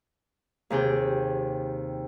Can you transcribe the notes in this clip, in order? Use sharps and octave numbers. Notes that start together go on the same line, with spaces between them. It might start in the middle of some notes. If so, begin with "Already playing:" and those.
D#2 C3 G#4 G5